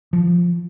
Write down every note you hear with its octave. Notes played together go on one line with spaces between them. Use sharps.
F3